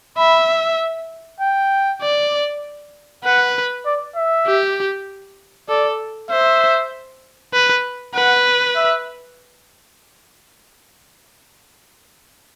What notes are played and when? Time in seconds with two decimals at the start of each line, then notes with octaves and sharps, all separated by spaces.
0.17 E5 B5
1.40 G5
2.02 D5
3.24 B4 F#5
3.86 D5
4.16 E5
4.46 G4
5.69 A4 D5
6.30 C5 E5
7.53 B4
8.14 B4 F#5
8.76 E5